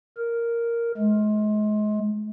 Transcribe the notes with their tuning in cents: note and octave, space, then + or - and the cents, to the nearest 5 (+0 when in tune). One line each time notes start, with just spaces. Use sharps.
A#4 +0
G#3 +35